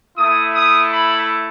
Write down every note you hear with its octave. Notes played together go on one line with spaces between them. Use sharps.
A3 E4 D#6
D#6
B5